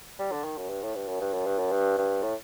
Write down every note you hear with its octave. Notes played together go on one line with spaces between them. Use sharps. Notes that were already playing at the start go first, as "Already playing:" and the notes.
G3
D3
D#3
F#2
G2
A2
G2
F#2
G2
F#2
G2
F#2
G2
G2
A2